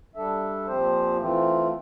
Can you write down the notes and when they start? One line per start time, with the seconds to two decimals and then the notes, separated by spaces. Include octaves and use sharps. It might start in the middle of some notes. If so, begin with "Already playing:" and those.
0.15 G3 D4 A4 E5
0.66 A#2 F3 C4 G4 C5
1.18 E3 A3 C4 F4